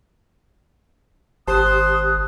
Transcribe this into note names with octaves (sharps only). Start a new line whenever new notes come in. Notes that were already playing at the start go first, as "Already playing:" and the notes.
G#1 G4 C5 A5 D#6 F#6